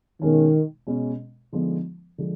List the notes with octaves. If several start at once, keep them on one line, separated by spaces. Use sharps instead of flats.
B2 D#3 G#3 C#4
B2 G#3 C#4
D3 F3 G#3 B3 D#4
D3 F3 G#3